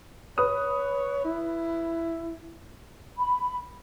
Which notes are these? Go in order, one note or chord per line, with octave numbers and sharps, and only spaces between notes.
B4 C#5 D#6
E4
B5